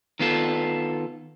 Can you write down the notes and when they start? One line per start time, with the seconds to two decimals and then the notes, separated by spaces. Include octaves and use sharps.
0.19 D#3 B3 F4 A4